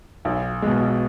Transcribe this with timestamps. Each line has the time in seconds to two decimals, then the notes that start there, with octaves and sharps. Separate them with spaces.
0.25 B1
0.62 B2 G#3